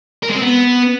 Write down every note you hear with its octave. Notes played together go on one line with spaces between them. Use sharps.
A#4
G#3
C4
B3